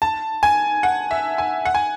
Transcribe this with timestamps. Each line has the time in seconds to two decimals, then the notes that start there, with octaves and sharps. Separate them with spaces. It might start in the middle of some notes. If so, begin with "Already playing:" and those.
0.02 A5
0.43 G#5
0.83 F#5
1.11 E5
1.38 G#5
1.65 F#5
1.75 G#5